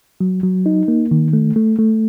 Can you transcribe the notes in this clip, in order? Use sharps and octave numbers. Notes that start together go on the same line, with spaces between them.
F#3
F#3
D#4
A#3
D#3
A3
A3
A3